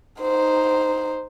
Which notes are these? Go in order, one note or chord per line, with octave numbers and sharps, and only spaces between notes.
D#4 C5